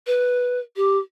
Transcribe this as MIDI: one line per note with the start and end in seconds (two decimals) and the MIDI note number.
0.07 0.60 71
0.76 0.98 67